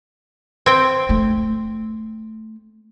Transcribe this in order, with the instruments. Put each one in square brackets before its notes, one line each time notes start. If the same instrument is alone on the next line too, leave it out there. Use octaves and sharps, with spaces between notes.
[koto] C4 G5
[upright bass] A3